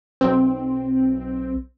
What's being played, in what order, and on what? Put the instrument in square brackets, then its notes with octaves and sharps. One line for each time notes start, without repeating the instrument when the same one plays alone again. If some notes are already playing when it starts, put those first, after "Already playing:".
[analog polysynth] B1 C4